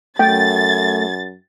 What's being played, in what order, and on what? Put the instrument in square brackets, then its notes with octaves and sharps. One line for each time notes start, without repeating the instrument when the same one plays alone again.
[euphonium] F#2 [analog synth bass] A3 [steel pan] G5 [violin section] A6